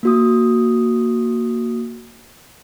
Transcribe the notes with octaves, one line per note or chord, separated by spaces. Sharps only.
A#3 F#4 D#6